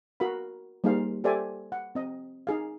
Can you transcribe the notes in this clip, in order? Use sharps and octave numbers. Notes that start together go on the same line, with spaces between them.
F#4 A#4 F5 B5
G3 A#3 D#4 G#4 C5 F5
G4 A4 C5 D5 E5 G#5
F#5
C4 D#5
D#4 G#4 F5